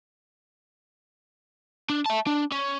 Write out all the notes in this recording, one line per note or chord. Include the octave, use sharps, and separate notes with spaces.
D4
E5 A5
D4
C#4